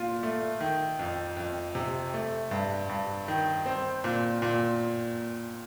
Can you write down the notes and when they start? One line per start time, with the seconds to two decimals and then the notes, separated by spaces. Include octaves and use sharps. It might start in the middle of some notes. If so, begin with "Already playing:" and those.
Already playing: A#2 F4
0.23 A3
0.61 D#3
0.99 F2
1.37 F2
1.75 C3
2.14 A3
2.51 G2
2.89 G2
3.28 D#3
3.66 C4
4.04 A#2
4.42 A#2